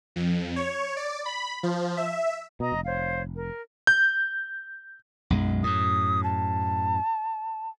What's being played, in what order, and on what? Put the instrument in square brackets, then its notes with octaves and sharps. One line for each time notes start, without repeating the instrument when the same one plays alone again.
[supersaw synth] F2
C#5
D5
B5
F3
E5
[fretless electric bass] B2 [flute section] D#5 A#5 D#6
[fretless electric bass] F1
[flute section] C5 C#5 F5
A#4
[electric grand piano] G6
[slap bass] B1 F#2 G#3
[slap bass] F#2 A2 [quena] D#6
[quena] A5